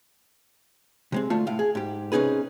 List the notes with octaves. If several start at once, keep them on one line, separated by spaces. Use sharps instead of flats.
C3 G#3 C4
D2 A3 F4
A2 F5
G#4
G#2 G4
C3 C#4 D#4 G#4 B4